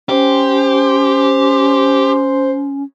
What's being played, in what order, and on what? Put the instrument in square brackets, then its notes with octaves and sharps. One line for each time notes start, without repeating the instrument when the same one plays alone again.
[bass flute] C#4 [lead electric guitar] G4 [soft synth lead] C5